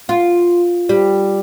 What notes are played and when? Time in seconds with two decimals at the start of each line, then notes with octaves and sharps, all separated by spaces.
0.09 F4
0.89 G3